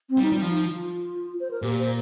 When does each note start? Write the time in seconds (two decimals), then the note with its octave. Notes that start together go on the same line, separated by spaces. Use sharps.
0.10 C4
0.17 G3 D#4
0.32 G3 F4
0.42 F3
0.50 D#4
0.66 F4
1.40 C5
1.51 A#4
1.62 A#2 G4
1.79 C5